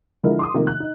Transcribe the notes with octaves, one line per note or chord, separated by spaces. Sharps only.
D3 F3 G#3 E4 A#4
C6 D6 D#6
C3 D#3 F3 A3 A#3
F#6
D#4